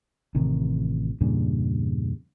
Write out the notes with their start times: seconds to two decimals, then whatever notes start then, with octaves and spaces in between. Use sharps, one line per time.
0.35 A1 C3 D#3
1.21 E2 G2 A#2 C#3